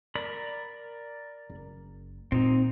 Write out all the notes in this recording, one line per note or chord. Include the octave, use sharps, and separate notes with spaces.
A#4 D5 B5
F#1
A#2 C4 D#4